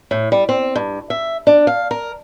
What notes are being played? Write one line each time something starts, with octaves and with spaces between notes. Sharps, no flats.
A2
G3
C4
G2
E5
D4
F5
A#4